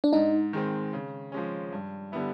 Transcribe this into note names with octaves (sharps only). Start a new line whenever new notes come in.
D4
G#2 D#4
D#3 G#3 C4
C#3
F3 G#3 C#4
G2
D3 G3 B3 E4